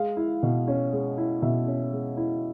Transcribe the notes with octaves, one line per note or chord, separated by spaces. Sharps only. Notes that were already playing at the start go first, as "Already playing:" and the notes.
Already playing: G#3 F5
E4
B2
C#4
G#3
E4
B2 E5
C#4
G#3
E4